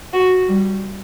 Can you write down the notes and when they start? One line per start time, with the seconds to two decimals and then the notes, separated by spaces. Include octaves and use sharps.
0.13 F#4
0.48 G3